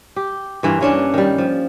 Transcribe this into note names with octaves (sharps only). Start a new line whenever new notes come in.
G4
G2 E3 A#3 F4
E3 C#4 D4
D#3 G3
F3